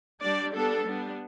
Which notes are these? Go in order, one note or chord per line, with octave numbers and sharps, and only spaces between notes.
G3 D4 D5
G3 B3 D4 A4
G3 B3 D4